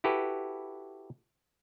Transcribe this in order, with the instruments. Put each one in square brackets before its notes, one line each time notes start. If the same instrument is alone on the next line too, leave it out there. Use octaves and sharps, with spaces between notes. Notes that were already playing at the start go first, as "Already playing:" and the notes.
[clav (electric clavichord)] E4 F#4 G4 A4 B4